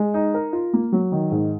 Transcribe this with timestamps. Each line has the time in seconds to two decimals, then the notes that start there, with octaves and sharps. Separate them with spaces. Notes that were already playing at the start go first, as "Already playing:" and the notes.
Already playing: G#3
0.14 D#4
0.34 A#4
0.53 F4
0.73 A#3
0.92 F#3
1.12 D#3
1.31 G#2